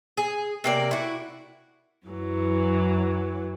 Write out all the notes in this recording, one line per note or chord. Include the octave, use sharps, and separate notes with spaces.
G#4
C3 A#3 D5
E4 F#4
F#2 E3 F#3